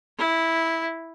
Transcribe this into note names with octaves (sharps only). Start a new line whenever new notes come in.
E4